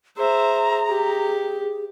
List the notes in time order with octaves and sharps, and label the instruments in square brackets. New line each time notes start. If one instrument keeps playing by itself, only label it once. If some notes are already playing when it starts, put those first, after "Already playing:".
[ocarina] G#4 [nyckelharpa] C5 E5 [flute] A#5
[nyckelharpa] G4